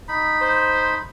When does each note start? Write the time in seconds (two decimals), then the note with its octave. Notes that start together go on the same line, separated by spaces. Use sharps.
0.08 D#4 B5
0.41 C5